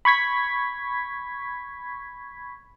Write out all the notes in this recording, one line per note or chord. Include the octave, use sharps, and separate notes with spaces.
B5 C#6 G#6 B6